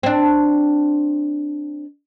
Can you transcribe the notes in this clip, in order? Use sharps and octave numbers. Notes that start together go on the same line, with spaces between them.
C4 D4